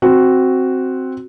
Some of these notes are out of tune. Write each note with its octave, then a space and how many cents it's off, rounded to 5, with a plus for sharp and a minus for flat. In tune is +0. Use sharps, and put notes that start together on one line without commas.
C4 +0 F#4 +0